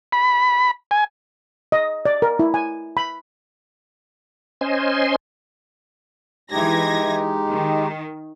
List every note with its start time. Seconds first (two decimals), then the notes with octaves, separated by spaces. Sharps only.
0.12 B5
0.91 G#5
1.72 D#5
2.05 D5
2.22 A#4
2.39 E4
2.54 G#5
2.97 B5
4.61 C#4 C5 D#5 G#5 C6
6.51 E3 G#3 D#4 G4 G#6 A#6
7.48 D#3